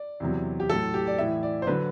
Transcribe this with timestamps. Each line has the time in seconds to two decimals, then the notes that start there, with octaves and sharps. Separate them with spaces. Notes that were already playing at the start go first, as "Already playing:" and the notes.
Already playing: D5
0.20 E2 C3 F#3
0.60 G4
0.69 A2 F#3 A4
0.94 G4
1.07 D5
1.18 A2 E3 E5
1.43 D5
1.62 C5
1.67 D3 F#3 B4